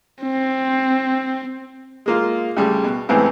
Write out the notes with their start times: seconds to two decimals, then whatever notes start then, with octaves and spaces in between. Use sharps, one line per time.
0.23 C4
2.06 G#3 A#3 F4
2.57 D2 C#3 G3
2.84 B2
3.09 C#2 A2 E3 B3 C4